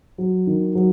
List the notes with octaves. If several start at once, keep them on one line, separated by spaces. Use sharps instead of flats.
F#3
D#3
F#3